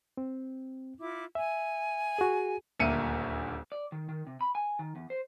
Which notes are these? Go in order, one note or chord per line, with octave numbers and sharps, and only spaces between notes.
C4
E4 F4 D6
E5 G#5
F#4 G#4
D#1 D2 A#3 E5 C#7 D#7
D5
D#3
D#3
C3
B5
G#5
D#3
E2
C5